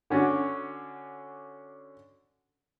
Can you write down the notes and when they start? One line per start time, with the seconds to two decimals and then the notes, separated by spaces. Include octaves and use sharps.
0.10 D3 C#4 D4 F#4